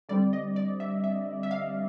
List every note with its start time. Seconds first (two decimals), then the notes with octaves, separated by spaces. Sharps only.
0.09 D3 G3 C4 D5
0.33 D#5
0.56 D5
0.80 E5
1.04 E5
1.43 E5
1.51 F5